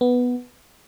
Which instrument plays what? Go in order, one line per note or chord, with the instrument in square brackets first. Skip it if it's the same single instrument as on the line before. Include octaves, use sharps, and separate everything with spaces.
[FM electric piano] B3